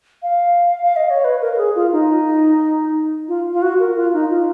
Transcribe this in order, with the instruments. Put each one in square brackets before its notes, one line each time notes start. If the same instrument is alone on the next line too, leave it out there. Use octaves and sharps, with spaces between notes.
[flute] F5
F5
D#5
C#5
B4
A#4
A#4
G#4
F4
D#4
F4
F4
F#4
A#4
F4
D#4
F4